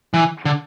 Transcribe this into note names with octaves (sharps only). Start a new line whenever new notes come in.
E3
D3